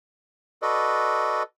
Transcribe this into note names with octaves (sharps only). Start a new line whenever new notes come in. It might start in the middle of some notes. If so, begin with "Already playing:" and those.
F#4 A4 B4 D5 D#5